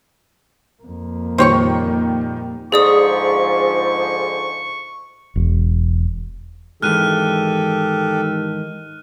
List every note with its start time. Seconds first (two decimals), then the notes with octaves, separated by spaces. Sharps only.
0.83 F2 A#3
1.38 A#2 D#3 G3 C5 C#5 C#6
2.72 G#2 D3 F3 G#4 D5 C#6 D#6
5.36 E1
6.82 G#2 D#3 E3 G4 A4 F6 F#6 D#7